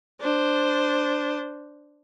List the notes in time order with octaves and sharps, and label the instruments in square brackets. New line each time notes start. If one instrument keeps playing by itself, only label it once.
[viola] D4 C5